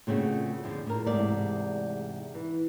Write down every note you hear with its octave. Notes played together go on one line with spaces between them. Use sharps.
A#2 C#3 A3 C4 F#4
F2 D3 F3
A2 A#4
E2 G#2 C3 A3 D5
E3